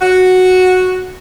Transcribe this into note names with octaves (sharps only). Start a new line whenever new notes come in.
F#4